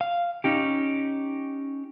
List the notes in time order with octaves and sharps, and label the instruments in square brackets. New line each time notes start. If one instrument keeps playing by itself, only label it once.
[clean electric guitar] F5
C#4 D#4 G4